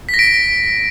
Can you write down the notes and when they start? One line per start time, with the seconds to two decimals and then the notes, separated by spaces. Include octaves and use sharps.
0.09 B6
0.14 A#6
0.19 D7